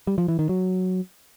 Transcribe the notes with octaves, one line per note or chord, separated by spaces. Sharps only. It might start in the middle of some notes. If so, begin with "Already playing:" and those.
G3
F3
E3
D#3
F#3